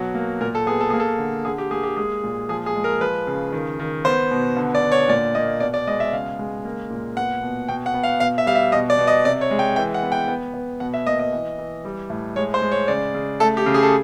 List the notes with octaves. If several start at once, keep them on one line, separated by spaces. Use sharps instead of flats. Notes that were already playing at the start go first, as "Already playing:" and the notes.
Already playing: B2 F#3
A#3
A#2 A#4
A4
B3 G#4
A4
A#3 G#4
A4
D3
D3 G#4
G4
A#3 G#4
G4
G#3 G#4
A#2
F3 G#4
G#4
G#3
A#4
F3 B4
C#3
D#3
D#3
B3 C5
B2
D3
D5
D3
C#5
A#2 D5
A#3 D#5
B2 D5
D5
G#3 D#5
E5
C#3 F5
G#3
A#3
A#2
B3 F#5
B2
B2 G5
F#5
B3
F5
B2 F5
E5
G3 F5
E5
B2 D#5
D5
B2
D#5
C3 D5
C#5
G#3
G5
E3 G5
F#5
B3
G5
B3
B3
B2 F#5
E5
A#3 D#5
D#5
E3
E3
G3
A2
G#3 C#5
C5
G#3
C#5
C#3 D5
C#3
A3 A4
G4
C#3
G#4
A4